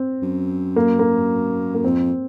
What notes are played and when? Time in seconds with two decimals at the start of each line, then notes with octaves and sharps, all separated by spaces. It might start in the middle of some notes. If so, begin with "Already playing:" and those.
Already playing: C4
0.22 F#2
0.76 A#3
0.99 A#3
1.74 A#3
1.83 F2 C4